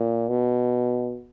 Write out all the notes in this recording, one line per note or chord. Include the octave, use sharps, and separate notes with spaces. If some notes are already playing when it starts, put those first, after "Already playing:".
Already playing: A#2
B2